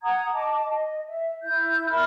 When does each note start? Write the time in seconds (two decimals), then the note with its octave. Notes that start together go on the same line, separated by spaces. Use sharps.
0.03 F#5 A#5 D#6 G#6
0.33 D#5 A5 D6
0.67 D#5
1.07 E5
1.42 E4 G6
1.88 A#4 E5 B5 F6